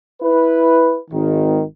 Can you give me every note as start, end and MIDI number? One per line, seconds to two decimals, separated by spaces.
0.22 0.98 64
0.22 0.98 71
1.11 1.62 32
1.11 1.62 51